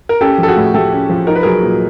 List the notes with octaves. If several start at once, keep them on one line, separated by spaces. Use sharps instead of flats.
A#4
C#4 G4 A4
F3 A4
F#4 G#4
A2
A3 G4 A4
C#4
F3
D#4 A#4
B4
F#3 G#4 A#4
A#2